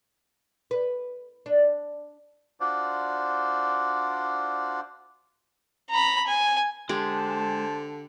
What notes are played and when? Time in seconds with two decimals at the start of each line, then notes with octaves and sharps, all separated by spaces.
0.71 B4
1.46 D4
2.60 D4 F4 F#4 C5 D5
5.90 A#5 B5
6.27 G#5
6.89 D3 G#3 G4 C5 A5